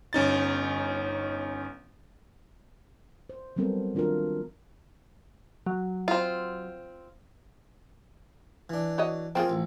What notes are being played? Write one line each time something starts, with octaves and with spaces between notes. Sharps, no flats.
G1 C#4 D#4 A6
C5
F#3 G3 B3 C4 A4 A#4
D#3 D4 F4 F#4 A#4
F#3
C4 F4
E3 D4
F#4 C#5 D#5
F3 A#3 C4 F4 G#4
A1